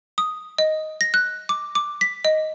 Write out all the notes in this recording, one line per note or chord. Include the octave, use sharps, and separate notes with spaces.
D#6
D#5
A#6
F#6
D6
D6
B6
D#5